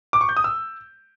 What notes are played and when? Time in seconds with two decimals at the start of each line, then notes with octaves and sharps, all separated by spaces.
0.13 D6
0.21 C#6
0.29 G6
0.37 D#6
0.44 E6